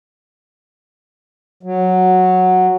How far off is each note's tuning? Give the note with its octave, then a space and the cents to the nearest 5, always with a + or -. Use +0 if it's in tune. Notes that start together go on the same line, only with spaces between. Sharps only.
F#3 -5